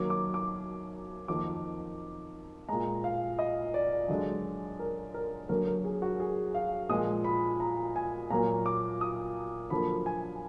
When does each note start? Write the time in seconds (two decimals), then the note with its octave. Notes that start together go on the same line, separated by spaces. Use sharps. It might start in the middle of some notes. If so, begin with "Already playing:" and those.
Already playing: F#2 D#3 F#3 A#3 D6
0.10 D6
0.34 D6
1.28 F2 D#3 A#3 D6
2.69 A#2 G#3 A#5
3.04 F5
3.39 D#5
3.74 D5
4.08 F#2 D3 G#3
4.79 A#4
5.14 A#4
5.49 F#2 D3 F#3 A#3 A#4
5.67 A#4
5.85 G#4
6.02 F#4
6.20 G#4
6.55 F5
6.89 A#2 F3 G#3 D#6
7.24 B5
7.60 A#5
7.96 G#5
8.30 A#2 F#3 A#3 A#5
8.66 D6
9.01 D#6
9.70 F#2 D3 F3 A#3 B5
10.06 G#5